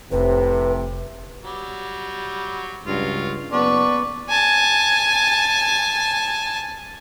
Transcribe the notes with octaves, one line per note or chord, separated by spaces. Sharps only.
F1 A2 C3 B4
F#3 G3
C#2 G2 F#3 F4
F#1 B3 B4 D5 A5 C#6
G#5 A5